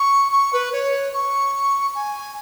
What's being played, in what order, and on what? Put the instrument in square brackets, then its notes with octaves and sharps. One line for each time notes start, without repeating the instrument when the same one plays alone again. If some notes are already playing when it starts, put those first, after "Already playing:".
Already playing: [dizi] C#6
C#6
B4
C#5
C#6
G#5